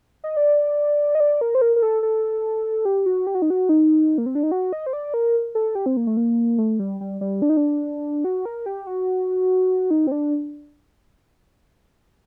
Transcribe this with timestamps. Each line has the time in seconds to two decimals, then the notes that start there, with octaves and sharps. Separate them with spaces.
0.24 D#5
0.37 D5
1.15 D#5
1.20 D5
1.41 A#4
1.55 C5
1.62 A#4
1.76 A#4
1.82 A4
2.03 A4
2.85 G4
3.06 F#4
3.27 G4
3.35 F#4
3.42 D#4
3.50 F#4
3.69 D#4
4.18 A#3
4.26 C4
4.35 D4
4.43 D#4
4.52 F#4
4.73 D#5
4.86 C5
4.93 D5
5.14 A#4
5.55 A4
5.75 G4
5.86 C4
5.97 A#3
6.07 A3
6.17 A#3
6.58 A3
6.79 G3
7.01 G3
7.21 G3
7.42 D4
7.50 D#4
7.57 D4
8.24 F#4
8.45 A#4
8.66 G4
8.87 F#4
9.91 D#4
10.07 C4
10.12 D4